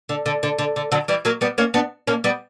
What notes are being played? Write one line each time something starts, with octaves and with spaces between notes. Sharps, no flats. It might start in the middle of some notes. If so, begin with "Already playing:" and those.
D3
D3
D3
D3
D3
D3 F#3
E3 G3
F#3 A#3
G3 B3
A#3 C#4
B3 D4
A#3 C#4
G3 B3